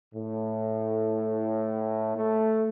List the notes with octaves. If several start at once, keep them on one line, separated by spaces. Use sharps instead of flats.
A2
A3